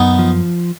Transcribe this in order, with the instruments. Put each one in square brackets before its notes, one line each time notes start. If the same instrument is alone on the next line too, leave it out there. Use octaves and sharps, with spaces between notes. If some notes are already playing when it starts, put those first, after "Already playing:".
Already playing: [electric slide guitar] F#2 [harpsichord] B3 D#4
[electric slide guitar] F3